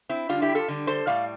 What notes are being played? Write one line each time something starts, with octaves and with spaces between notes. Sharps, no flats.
C4 E4
D3 G3 D4 F4
E4 G4
F4 A4
D3 G3
A4 C5
A2 G3 D5 F5